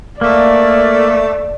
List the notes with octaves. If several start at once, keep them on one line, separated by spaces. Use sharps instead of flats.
A3 A#3 D5